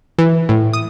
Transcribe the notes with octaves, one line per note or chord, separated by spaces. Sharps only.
E3
A2
D#6